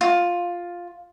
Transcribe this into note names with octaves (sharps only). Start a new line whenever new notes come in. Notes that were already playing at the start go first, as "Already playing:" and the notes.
F4